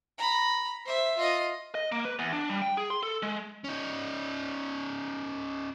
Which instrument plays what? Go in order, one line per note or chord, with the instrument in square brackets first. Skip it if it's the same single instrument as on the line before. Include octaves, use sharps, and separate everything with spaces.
[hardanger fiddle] A#5 B5
C5 E5
F4 D#5
[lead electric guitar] D#5
A#3
B4
E2
D4
G3
G5
G#4
C6
A4
G#3
C#4 D#4